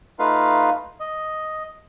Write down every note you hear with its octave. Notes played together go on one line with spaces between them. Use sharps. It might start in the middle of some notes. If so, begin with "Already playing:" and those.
A3 D#4 F4 B4 F5
D#5